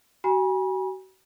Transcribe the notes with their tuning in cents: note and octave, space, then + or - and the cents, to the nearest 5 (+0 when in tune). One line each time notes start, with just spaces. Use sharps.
F#4 +35 G#5 -25 B5 -40